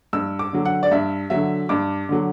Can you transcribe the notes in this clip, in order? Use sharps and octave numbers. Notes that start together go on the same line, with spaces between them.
G2 E6
D6
D3 F#3
F#5
D5
G2 E5
D3 F#3 E5
G2 D6
D3 F#3